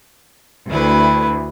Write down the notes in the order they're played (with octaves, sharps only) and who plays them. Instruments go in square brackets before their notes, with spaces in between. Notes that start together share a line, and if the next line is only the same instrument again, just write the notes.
[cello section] D2 [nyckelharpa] E4 B4